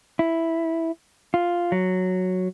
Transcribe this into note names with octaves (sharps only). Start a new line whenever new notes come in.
E4
F4
F#3